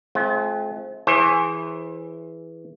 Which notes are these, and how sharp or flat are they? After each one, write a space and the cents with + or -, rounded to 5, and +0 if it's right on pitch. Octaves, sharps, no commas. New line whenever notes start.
G#3 +45 C4 +20 F4 +0
E3 +0 G#4 +0 C5 +40